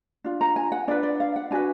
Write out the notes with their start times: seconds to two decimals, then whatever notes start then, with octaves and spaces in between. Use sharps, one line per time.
0.24 D4 F4
0.41 A#5
0.56 G#5
0.72 F#5
0.88 D4 F4 G#4 B4 D5
1.03 D5
1.20 F5
1.36 F#5
1.51 D4 F#4 B4 G#5